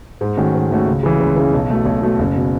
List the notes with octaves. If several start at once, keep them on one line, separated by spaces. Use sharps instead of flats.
G#2
D#3 A3 C#4 F#4
G#2
D#3 A3 C#4 F#4
C#2
C#3 E3
C#2
C#3 E3
B1
B2 A3
B1
B2 A3
F#1
B2